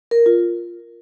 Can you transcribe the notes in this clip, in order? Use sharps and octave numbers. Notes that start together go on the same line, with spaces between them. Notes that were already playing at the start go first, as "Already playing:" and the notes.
A#4
F4